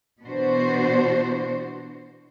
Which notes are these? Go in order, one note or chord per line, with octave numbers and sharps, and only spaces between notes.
B2 E3 B3 D4 F#4 C5